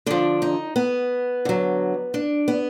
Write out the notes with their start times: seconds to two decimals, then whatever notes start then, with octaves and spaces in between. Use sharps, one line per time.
0.06 D3 F3 D4
0.42 D#4
0.76 B3
1.45 D3 F#3
2.14 D4
2.48 B3